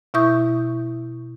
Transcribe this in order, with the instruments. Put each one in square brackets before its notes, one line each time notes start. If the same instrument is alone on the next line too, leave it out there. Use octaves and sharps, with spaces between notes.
[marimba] B2 E4 E5 C#6 D#6 G6